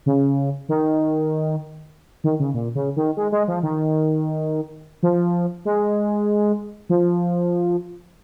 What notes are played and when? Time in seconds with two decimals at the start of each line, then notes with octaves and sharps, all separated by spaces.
0.06 C#3
0.69 D#3
2.24 D#3
2.40 C#3
2.54 A#2
2.75 C#3
2.96 D#3
3.17 G#3
3.32 G#3
3.48 F3
3.63 D#3
5.03 F3
5.65 G#3
6.89 F3